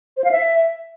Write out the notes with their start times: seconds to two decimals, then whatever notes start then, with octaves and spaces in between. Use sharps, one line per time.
0.17 C5
0.24 F5
0.31 E5